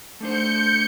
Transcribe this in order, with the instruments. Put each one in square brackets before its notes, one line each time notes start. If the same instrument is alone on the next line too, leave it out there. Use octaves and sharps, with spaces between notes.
[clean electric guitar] A3 D4 C5 [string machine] G6 C#7